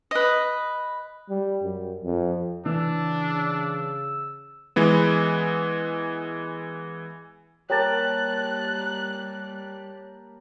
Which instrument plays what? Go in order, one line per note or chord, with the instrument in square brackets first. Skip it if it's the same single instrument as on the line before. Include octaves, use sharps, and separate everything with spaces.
[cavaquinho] B4 D#5
[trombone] G3
F#2
F2
[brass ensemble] C#3 [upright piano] E3 [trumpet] D4 [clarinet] E6
[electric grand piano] E3 G#3 B3
[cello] G3 A#3 [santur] G4 A#4 A5 [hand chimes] C#5 [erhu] F#6